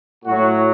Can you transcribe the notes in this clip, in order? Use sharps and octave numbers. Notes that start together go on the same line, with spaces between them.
A2 F#3 F#4